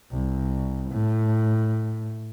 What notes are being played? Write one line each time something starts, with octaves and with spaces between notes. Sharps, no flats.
C2
A2